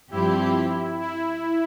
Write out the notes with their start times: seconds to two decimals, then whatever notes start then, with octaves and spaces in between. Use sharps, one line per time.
0.11 G2 F3 C4 E4 G4
1.02 E4